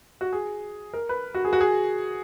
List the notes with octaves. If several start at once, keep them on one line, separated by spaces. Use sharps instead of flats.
F#4
G#4
A#4
B4
F#4
G#4
F#4
G#4